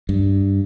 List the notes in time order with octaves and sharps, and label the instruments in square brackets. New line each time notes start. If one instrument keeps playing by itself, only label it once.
[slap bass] G2